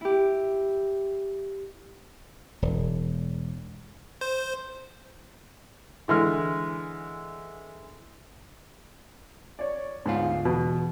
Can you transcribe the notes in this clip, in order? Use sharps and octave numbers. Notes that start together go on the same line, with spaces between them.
E4 G4
E1
C5
D3 E3 G#3 F6
C#5 D5
D2 G#2 B3 F4
E2 B2